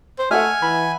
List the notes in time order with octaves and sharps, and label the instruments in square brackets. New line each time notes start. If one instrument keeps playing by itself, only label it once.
[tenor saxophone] C5
[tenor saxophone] A3 [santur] E5 F#5 [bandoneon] G#5 [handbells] F6
[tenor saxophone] E3 [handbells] B5